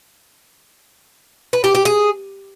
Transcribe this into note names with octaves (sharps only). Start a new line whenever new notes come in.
B4
G4
G4
G#4